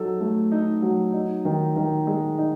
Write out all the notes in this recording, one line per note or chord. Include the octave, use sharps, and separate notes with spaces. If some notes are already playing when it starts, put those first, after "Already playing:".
Already playing: F#3 D#4 A4
A3
D#4
F#3
D#4
D#3
D#3
G#3
D#4